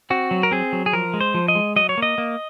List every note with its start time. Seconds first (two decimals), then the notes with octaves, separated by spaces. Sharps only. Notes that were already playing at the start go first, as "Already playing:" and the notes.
0.10 C4 F#4
0.31 F#3
0.43 A#4
0.51 C4 G#4
0.73 F#3
0.86 G#4
0.93 F3 A#4
1.14 G#3
1.21 C5
1.34 F3
1.48 D#5
1.55 G#3
1.76 F#3 D#5
1.89 C#5
1.98 A#3 D#5
2.18 A#3